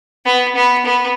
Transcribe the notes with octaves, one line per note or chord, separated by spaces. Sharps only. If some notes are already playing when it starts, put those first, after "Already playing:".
B3
B3
B3